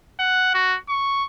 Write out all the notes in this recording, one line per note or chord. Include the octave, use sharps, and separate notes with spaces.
F#5
F#4
C#6